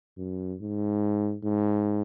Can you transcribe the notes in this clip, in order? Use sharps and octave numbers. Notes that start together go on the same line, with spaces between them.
F#2
G#2
G#2